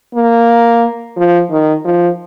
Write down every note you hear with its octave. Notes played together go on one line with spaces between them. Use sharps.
A#3
F3
D#3
F3